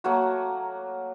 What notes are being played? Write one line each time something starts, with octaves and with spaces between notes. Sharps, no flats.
F#3 A3 A#3 F#4